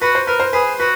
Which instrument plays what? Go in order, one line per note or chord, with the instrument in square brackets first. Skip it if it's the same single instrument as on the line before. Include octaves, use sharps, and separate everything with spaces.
[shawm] F#4 [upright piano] B4
[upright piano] C5
[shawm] A#4 [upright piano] B4
[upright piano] C5
[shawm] G#4 [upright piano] B4
[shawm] F#4 [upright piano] B4